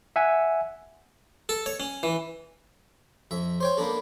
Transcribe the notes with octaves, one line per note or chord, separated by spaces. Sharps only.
E5 F#5 G#5
A4
C#5
C#4
E3
F2 E5
C5 C#5 G5
A#3 B3 D4 A4